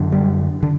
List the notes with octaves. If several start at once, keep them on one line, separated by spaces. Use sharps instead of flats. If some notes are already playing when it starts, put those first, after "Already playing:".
Already playing: F#2 D3
G3
D3